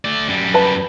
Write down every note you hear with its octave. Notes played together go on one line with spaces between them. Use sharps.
A3 D5
F#2 G3
B4 A5 B5